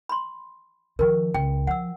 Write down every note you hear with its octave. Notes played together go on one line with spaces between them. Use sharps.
B5 C6
D#3 F3 A#4
C#2 G5
F3 F#5 E6